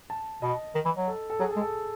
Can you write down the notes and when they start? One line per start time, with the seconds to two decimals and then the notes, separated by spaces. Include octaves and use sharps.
0.10 A5
0.42 B2 D#5
0.75 D#3
0.85 E3
0.97 F#3
1.08 A4
1.30 A4
1.40 F#3 G#4
1.51 A4
1.56 G#3
1.62 A4